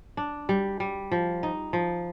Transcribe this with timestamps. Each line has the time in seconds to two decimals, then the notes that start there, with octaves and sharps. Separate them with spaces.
0.17 D4
0.49 G3
0.80 G3
1.12 F3
1.43 D#4
1.73 F3